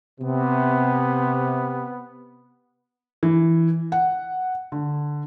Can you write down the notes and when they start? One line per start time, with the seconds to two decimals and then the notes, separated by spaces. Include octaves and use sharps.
0.20 C3 B3
3.23 E3
3.92 F#5
4.72 D3